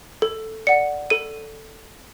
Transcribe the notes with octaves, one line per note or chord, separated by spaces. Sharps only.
A4
D5 F#5 C#7
A4 D#7